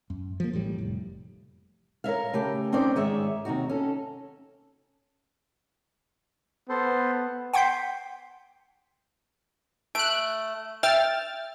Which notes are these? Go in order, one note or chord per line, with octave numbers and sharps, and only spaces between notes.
F#2
F3 A#3
A1 A2 G3
F1
A#4 C#5 E5 F5
C#3 A3 G4
C4 C#4 D#4 C5 D5
G#2 D#3 G#4 C#5 E5
D#2 C3 D#4 F#4
C#4 A4
B3 A4 C5
F#5 G5 C6 G6 B6 C7
A3 F#6 D7
E5 G5 F6 A6